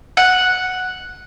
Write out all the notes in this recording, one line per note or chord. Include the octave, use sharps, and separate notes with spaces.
F#5